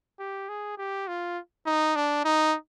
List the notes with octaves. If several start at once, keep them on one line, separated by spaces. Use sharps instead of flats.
G4
G#4
G4
F4
D#4
D4
D#4